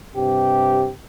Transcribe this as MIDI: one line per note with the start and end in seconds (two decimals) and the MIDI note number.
0.15 0.90 43
0.15 0.90 48
0.15 0.90 67